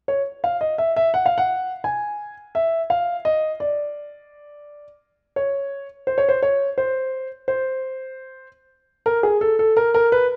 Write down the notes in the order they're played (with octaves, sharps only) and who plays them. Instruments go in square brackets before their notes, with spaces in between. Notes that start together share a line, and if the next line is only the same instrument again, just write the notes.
[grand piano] C#5
F5
D#5
E5
E5
F#5
F5
F#5
G#5
E5
F5
D#5
D5
C#5
C5
C#5
C5
C#5
C5
C5
A#4
G#4
A4
A4
A#4
A#4
B4